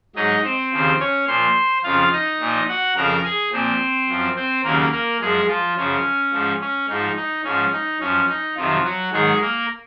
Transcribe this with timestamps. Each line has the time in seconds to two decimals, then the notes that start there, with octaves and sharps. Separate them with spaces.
0.16 G#2 F#3 D#4 D#5
0.44 C4 C5
0.72 D#2 C#3 F3
1.00 C#4 C#5
1.27 A#2 F3 C5 C6
1.84 F2 C#3 F3 F4 F5
2.12 D#4 D#5
2.40 A#2 F3
2.68 F#4 F#5
2.96 F2 C#3 F3 A#4 A#5
3.24 G#4 G#5
3.52 A#2 F3 C4 C5
4.08 F#2 F3
4.36 C4 C5
4.64 D#2 C#3 F#3 A#3 A#4
4.92 A#3 A#4
5.20 F#2 F3 G#3 G#4
5.48 F3 F4
5.76 F#2 C#3 F3 C#4
6.32 G#2 F3
6.61 C#4
6.89 G#2 F3 D#4
7.16 D#4
7.44 G#2 F3 C#4
7.73 D#4
8.00 F#2 F3 C#4
8.29 D#4
8.57 F2 C3 D#3 F3 F#3 F4
8.84 F#3 F#4
9.12 G#2 D#3 F#3 G#3 G#4
9.41 A#3 A#4